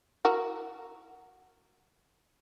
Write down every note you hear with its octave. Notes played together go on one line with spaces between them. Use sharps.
E4 F#4 A#4